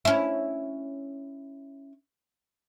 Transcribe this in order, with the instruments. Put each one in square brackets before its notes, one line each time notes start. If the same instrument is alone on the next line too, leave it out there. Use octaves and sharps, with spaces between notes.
[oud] C#4 E4